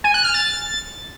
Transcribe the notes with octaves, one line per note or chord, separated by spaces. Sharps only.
G#5
F#6
F6
A6